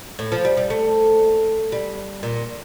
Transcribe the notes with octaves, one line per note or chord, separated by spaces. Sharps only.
A2
F3
G3
G3
A3
G3
A#2